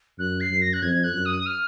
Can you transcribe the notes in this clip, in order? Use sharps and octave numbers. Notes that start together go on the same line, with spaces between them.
F#2 F#6
C7
F#2
A#6
F#6
F2 G#6
F#6
F#2
D#6
F6